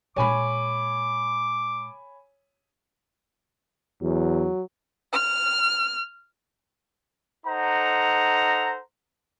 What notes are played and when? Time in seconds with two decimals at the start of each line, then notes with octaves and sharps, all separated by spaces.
0.16 A#2 G#3 C#5 G#5 B5 D6
4.02 E2 F#3
5.11 F6
7.46 D#4 A4 C5 F#5 A#5